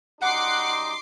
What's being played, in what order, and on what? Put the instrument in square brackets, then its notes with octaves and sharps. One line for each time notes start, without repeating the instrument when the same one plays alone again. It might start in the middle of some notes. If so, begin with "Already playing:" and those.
[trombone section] F#2 G3 D#4 [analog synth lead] F#5 [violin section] C6 D6 C7